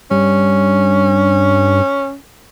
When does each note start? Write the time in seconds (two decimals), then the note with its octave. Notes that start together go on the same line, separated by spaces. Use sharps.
0.11 G2 C#4